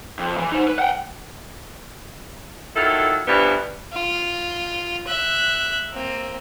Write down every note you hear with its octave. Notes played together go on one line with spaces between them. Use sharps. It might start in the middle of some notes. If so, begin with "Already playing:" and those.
F2
E3
D#4 C5
B4
F#5 G5
D#3 F#3 E4 F4 A4
G2 E3 F3 G3 B3 B4
F4
E5 F#6
A#3 C4